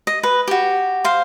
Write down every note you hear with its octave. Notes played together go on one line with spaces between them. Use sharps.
D#5
B4
F#4 G4
C5 F5